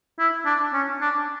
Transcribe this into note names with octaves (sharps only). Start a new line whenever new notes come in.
E4
D4
C#4
D4